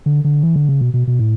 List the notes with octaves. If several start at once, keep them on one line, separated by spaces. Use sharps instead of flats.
D3
D3
E3
D3
C#3
B2
B2
B2
A2